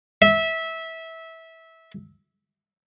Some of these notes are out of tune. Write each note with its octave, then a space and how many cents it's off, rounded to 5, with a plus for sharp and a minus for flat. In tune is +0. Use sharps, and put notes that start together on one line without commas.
E5 -20